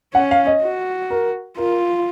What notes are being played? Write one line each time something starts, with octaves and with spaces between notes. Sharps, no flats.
C#4 F#5
F5
D#5
F#4
A#4
F4 A#4